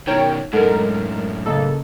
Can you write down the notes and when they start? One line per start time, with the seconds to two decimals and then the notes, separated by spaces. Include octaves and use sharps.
0.07 B2 D#3 D#4 E4 A#4 C#5 G5
0.53 F#2 A2 G#3 D#4 A4 A#4 F#5
1.46 C#3 A#3 E4 A4 D#5 D#6